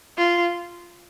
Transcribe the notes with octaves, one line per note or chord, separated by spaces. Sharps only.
F4